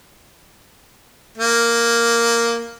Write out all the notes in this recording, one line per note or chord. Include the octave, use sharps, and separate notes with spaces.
A#3